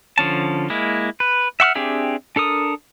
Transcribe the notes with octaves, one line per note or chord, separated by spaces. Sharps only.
D3 F3 C#4 A5
G#3 A#3 E4
B4
E5 F#5 C#6 F6
C4 D4 G4 G#4 E5
D4 A4 A#4 D#6